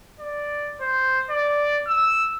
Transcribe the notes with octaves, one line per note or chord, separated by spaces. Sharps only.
D5
C5
D5
E6